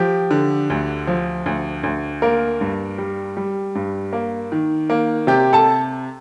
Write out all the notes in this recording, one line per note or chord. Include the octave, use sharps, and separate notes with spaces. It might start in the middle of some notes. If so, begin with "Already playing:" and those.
Already playing: F3 G4
D3
D2
F3
D2
D2
A#3 A#4
G2
G3
G3
G2
A#3
D#3
A#3
C3 G4 G5
A4 A5